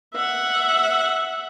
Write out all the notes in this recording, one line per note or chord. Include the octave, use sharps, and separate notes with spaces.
E5 F#5